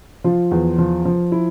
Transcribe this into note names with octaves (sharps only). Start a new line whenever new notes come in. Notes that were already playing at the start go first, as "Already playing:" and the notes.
F3 F4
E2
F3
F3
E4